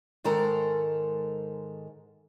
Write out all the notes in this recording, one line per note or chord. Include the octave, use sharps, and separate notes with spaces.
G#2 D#3 G#3 A4 A#4 A#5